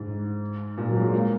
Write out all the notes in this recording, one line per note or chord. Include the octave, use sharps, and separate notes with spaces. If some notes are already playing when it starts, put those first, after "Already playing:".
Already playing: G#2
A#2
F#3
G#3
A#3